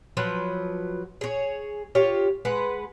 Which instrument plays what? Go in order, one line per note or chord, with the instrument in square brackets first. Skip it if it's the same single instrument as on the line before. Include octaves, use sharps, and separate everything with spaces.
[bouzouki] F3 F#3 B4
G#4 C#5
F4 G4 C#5
G#3 B4 F#5